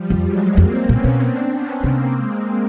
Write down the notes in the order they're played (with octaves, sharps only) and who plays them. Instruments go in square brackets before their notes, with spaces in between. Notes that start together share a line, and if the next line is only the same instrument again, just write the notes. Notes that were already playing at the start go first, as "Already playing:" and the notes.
Already playing: [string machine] F3 G3
[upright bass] F2
[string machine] F#3 G#3
[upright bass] F2 [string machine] A#3 C4
[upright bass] A#2 [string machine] B3 C#4
[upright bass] B2
[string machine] C4 D4
B3 C#4
[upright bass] C3 [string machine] A#3 C4
[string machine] G#3 A#3